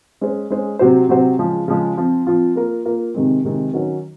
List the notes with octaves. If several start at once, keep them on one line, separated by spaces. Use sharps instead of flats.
G#3 C#4 G#4 C5
G#3 C#4 G#4 C5
C3 F#3 C4 F#4 C5
C3 F#3 C4 F#4 C5
C#3 F3 G#3
C#3 F3 G#3
F3 C4 F4
F3 C4 F4
A#3 F4 A#4
A#3 F4 A#4
C3 D#3 G#3 C4
C3 D#3 G#3 C4
D#3 F#3 C#4